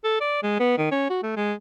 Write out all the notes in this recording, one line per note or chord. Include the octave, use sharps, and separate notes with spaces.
A4
D5
G#3
B3
D#3
C#4
F#4
A3
G#3